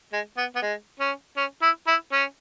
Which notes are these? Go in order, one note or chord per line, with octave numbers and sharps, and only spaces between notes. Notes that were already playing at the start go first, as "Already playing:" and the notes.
G#3
B3
B3
G#3
C#4
C#4
E4
E4
C#4